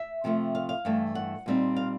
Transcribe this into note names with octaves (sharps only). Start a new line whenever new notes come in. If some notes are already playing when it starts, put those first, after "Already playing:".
Already playing: E5
C3 F3 A3 C4
F5
F5
G2 E3 A3
F#5
A#2 G3 C4 D#4
F5